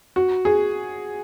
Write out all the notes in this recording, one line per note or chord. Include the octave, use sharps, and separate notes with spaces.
F#4
G#4